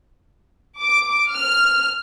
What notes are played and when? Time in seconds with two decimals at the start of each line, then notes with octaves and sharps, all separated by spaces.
0.81 D6
1.31 F6